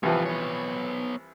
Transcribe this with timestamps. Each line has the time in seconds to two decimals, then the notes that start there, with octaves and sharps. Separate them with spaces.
0.03 C2 E3 F3 G3 F4
0.26 B3 C#5